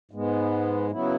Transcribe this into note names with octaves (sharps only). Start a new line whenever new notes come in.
G#2 G#3 B3
C#3 F#3 B3 E4